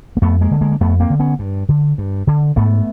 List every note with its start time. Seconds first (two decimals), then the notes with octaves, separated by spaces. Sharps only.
0.17 A#3
0.22 F2 A3 B3
0.41 G#3 A#3
0.51 D3
0.61 G#3 A#3
0.72 A#3
0.81 F2 A3 B3
1.00 A#3 C4
1.10 D3
1.20 B3 C#4
1.39 G2
1.69 D3
1.98 G2
2.27 D3
2.56 G#2 A3 B3